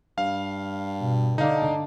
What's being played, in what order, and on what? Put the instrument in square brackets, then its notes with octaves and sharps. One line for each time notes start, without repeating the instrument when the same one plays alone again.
[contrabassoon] G2 [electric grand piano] F5
[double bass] B2
[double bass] D3 D4 [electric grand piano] D#4 F5